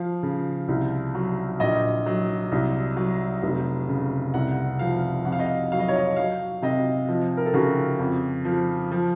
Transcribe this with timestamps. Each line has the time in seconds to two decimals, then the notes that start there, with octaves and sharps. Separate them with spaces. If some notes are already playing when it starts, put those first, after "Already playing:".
Already playing: F3 F5
0.23 C#3
0.68 C2
1.14 F#3
1.60 A#1 D#5
2.06 F#3
2.52 C2
2.97 F#3
3.43 F1
3.89 C#3
4.34 C2 F#5
4.79 F3 F5
5.25 F2 F#5
5.32 F5
5.39 D#5
5.46 F5
5.72 F#3 F5
5.79 D#5
5.88 C#5
5.96 D#5
6.16 F#3 F5
6.62 C3 D#5
7.09 F3
7.37 A#4
7.46 A4
7.54 C#3 F#4
7.99 F2
8.45 F3
8.92 F3